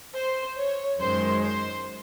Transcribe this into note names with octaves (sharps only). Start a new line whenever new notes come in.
C5
C#5
F#2 D#3 G#3 C5
C5